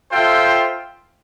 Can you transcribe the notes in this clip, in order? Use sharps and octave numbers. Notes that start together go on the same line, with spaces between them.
F4 A4 C5 E5 G5